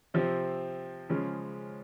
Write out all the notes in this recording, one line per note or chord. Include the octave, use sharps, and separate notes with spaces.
C3 F3 C4
C#3 F3 G#3 C#4